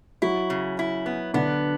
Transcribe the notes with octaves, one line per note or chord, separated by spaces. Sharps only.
F#3 E4 F#4
C#3
E4
B3
D3 B3 D4